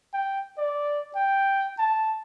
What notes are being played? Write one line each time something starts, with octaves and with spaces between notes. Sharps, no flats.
G5
D5
G5
A5